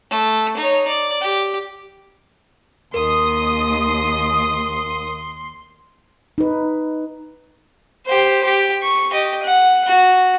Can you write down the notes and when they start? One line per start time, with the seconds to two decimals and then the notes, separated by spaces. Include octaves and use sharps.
0.11 A3
0.57 D#4 C#5
0.88 D5
1.21 G4
2.94 D#2 A#4 C6 D#6
6.38 D#4 B4
8.07 G4 C5
8.45 G4
8.83 C#6
9.12 G4 D#5
9.43 F#5
9.87 F#4